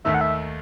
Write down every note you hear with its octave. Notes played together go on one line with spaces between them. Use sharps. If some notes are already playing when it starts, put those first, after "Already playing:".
D#2 D#3 A3 E5
F#5
E5